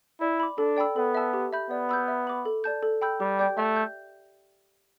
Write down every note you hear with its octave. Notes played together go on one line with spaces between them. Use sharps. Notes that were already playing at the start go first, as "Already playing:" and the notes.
E4 D5
B5 D6
D4 A4
D5 G5 B5 E6
B3 A4
E5 A5 E6
G4
E5 B5 G6
B3 D5
B5 E6 G6
E5
B5 D6
A4
D5 A5 G6
A4
G5 B5 E6 G6
G3 G4
D5 G5 D6 G6
A3 E5
G6